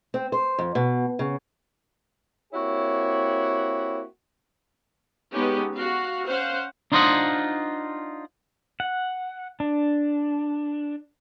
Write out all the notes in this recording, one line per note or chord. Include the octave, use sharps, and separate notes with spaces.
C4
C5
F2
B2
C#3
A#3 C4 E4 F#4 G4 C#5
G#3 B3 C#4 D#4 G4
F#4 F5
C#4 C5 F5 F#5
D4 D#4 F4 C5 D#5 F#5
F#5
D4